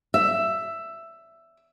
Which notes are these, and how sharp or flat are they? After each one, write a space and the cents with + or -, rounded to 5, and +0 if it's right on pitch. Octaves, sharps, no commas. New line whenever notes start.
E5 +10